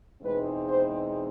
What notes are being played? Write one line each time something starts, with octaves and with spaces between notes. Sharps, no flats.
E2 B2 G#3 C4 D#4 B4
C5